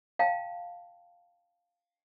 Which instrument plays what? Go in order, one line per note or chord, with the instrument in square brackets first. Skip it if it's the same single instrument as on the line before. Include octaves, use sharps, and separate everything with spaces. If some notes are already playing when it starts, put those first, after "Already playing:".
[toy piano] F5 G5 A5